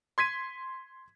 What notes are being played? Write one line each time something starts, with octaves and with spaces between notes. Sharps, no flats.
C6 G#6 B6 D#7